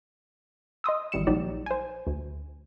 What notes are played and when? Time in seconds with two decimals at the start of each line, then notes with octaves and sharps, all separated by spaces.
0.84 D#5 C6 D#6 E6
1.12 G#1 E3 G3 C#7 E7
1.27 A#1 F#3 D#4 G4 D5
1.66 C5 G#5
2.07 D2